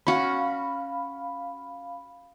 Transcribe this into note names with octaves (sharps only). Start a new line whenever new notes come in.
C#4 F#4 F5 B5